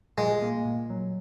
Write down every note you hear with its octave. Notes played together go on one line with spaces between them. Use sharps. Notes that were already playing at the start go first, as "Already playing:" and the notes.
A#2 G#3
A#3
A#2
F#3